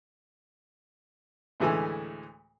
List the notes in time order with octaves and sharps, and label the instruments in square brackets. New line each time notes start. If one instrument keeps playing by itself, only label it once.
[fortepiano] D2 A2 E3 G#3 A3 G#5